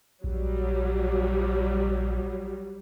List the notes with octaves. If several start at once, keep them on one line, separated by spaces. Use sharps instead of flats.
A#1 F#3 G3